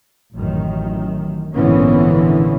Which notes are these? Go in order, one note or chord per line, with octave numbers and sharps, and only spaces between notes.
A1 F#2 D#3
A#1 G#2 D3 E3 B3 C#4